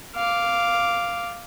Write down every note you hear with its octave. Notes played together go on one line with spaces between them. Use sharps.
F5 D6